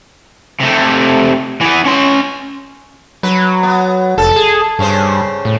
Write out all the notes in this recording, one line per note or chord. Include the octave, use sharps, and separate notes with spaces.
C3 A3
E3 B3
C#4 C6
F#3 B4
B3
F1 A4
G#4
G2 C#3 C#4 C5
A2